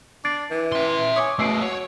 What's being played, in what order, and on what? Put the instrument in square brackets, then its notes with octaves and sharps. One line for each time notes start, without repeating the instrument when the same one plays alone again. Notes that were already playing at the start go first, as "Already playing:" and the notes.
[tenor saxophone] D4 [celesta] A6 C7 D7
[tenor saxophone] E3
[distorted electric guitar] E5 C6
[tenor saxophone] C#5 [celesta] G#5 D6 D#6
[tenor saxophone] B2 [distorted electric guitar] A3 G#4 [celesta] E6 C7 D7
[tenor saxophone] F#3 [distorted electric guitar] C#5